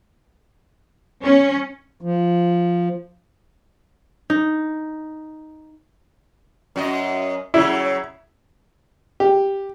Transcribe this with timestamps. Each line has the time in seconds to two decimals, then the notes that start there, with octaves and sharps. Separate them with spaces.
1.24 C#4
2.01 F3
4.30 D#4
6.76 F#2 F#4 D#5
7.54 C#3 F#3 E4
9.20 G4